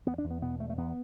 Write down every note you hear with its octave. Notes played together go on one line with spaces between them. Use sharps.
E2 B3
D4
E2
B3
B2 B3
E2 A3
A3
E2 B3